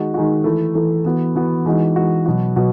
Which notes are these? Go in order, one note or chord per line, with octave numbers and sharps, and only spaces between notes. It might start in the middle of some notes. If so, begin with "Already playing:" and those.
Already playing: D#3 G#3 D#4 F#4
D#3 G#3 D#4 F#4
E3 A3 E4
E3 A3 E4
E3 B3 F#4
E3 B3 F#4
E3 G#3 D#4 F#4
E3 G#3 D#4 F#4
B2 F#3 B3 F#4
B2 F#3 B3 F#4